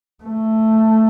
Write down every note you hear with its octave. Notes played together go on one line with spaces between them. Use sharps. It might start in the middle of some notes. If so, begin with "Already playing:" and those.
A3